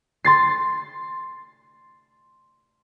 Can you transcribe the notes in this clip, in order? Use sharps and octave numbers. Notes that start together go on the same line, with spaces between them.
C6 A6 C7